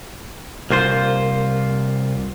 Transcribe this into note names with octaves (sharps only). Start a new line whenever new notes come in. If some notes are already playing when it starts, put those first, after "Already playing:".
C2 A#3 F4 C5